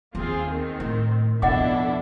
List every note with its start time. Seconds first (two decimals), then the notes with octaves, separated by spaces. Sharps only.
0.15 D#2 A#3 C4 F4 G#4
0.48 D#3 C4
0.80 A2
1.42 F2 B2 D4 E4 A4 D#5 F#5 D6